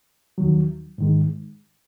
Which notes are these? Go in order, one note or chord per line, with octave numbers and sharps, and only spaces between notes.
D#2 D#3 F#3
G#2 D#3 G#3